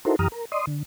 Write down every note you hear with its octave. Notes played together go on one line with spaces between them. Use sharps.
D#4 E4 F#4 A4 A#4 C5
F#2 E3 G4 A#5 D#6 F6
A#4
D5 D#5 C6 D#6
D3